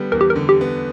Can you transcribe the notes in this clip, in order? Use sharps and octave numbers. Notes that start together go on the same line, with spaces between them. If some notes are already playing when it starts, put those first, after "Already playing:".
Already playing: D3 G3 B3
E2 A#4
G4
A#4
D3
G4
B3